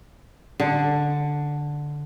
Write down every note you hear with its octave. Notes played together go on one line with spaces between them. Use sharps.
D3